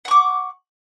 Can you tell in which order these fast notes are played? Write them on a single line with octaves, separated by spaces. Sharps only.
F#5 C#6 D6